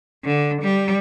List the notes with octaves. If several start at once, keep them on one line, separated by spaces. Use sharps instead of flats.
D3
G3